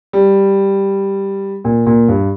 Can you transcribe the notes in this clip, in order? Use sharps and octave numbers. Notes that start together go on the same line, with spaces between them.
G3
A#2
A#2
G2